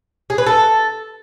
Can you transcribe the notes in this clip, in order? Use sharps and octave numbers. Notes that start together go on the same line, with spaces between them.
G#4
B4
A4